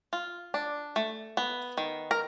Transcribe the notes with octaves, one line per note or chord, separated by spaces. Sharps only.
F4
D4
A3
B3
D#3
A#4